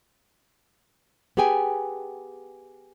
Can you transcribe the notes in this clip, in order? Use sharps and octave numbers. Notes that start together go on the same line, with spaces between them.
B3 G4 G#4 G5 G#5